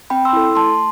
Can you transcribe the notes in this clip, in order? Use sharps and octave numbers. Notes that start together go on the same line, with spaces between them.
C4 G5 B5
C6 E6
E4 A4
A3 A5 C6